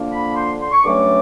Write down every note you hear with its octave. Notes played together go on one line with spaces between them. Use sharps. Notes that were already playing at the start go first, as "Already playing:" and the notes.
Already playing: D3 F3 A#3 D4
B5
C6
C6
C#6
G2 D3 F#3 A3 C#4 D6